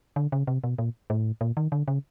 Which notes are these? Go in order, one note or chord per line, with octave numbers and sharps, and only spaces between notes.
D3
C#3
C3
B2
A#2
A2
A#2
D#3
D3
C#3